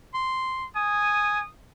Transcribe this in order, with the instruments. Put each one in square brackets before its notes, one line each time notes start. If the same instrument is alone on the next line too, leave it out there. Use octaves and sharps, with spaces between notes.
[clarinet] C6
[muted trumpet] G#5 [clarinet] D#6